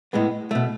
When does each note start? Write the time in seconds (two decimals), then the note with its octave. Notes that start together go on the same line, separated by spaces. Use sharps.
0.13 A2 G#3 B3
0.51 B2 A3